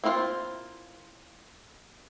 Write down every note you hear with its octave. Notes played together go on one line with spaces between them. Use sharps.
A#3 C4 E4 F4 C5